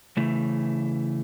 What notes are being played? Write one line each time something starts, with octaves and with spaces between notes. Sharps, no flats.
C#3 E3 A3